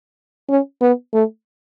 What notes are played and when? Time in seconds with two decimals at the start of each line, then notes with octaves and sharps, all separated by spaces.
0.49 C#4
0.81 B3
1.13 A3